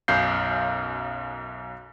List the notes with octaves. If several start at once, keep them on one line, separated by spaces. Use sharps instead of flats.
B1 F#2 F5 G6 C7